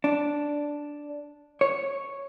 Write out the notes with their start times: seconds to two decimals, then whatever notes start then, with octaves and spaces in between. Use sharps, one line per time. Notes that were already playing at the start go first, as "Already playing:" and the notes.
0.04 D4
1.61 C#5